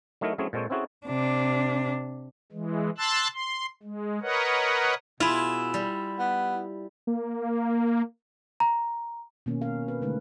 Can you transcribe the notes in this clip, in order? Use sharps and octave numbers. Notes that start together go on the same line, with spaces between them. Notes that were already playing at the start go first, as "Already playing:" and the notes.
F#3 A3 D#4 E4 A#4
F#3 A3 C4 C#4 E4 G#4
A#2 G#3 C4 A4 C#5 G5
C4 C#4 E4 F#4 G#4 A4
C3 D4
E3 G#3
A5 C6 E6 F#6 A6
C6
G#3
A#4 B4 C#5 D#5 F#5
B2 E4 F4 G#4
G3
B3
A#3
A#5
B2 D#3 A#3 C#4
C#4 A#4 F5
C4 B4
D3 G#3 A3 D#4 B4